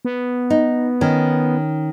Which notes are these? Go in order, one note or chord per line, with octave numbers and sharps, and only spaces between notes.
B3
D#4
D#3 C#4